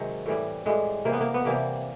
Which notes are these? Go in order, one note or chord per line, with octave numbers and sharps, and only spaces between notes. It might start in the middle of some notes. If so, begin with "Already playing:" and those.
Already playing: C3 D#3 F#3 G#3
A2 E3 G3
A2 E3 G3 G#3
C3 E3 G3 A#3
B3
A#3
B3
C3 E3 G3 A#3